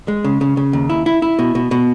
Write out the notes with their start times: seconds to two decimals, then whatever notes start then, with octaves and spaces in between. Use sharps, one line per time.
0.08 G#3
0.24 C#3
0.41 C#3
0.57 C#3
0.73 D#2
0.89 E4
1.06 E4
1.22 E4
1.39 B2
1.55 B2
1.71 B2